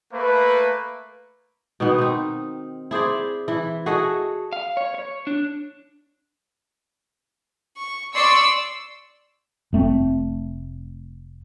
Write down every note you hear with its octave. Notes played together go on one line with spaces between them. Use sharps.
A3 A#3 B4
B2 D#3 B3
C4 D#4
E4 G#4 C5 D5
E3 E4
F#4 G#4 A4 D#5
F5
C#5
C#5
D4
C#6
D5 C6 C#6 E6
F1 A3 C4